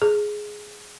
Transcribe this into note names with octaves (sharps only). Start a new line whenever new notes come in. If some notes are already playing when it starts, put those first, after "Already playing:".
G#4